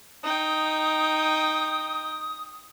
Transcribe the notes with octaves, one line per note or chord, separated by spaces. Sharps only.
D#4 G5 D#6